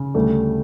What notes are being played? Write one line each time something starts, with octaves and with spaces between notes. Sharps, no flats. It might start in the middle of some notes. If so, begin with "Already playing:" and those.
Already playing: C#3
D2 G3 A3